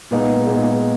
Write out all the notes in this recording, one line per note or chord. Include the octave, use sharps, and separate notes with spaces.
A#2 G#3 B3 D#4
A#2 G#3 B3 D#4